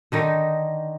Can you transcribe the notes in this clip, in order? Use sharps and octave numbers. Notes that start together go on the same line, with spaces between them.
D3 D#3 D#4